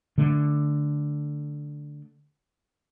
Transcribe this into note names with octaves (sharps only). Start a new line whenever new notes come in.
D3 A3